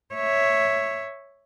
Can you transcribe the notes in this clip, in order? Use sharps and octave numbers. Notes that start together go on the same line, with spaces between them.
C#5 E5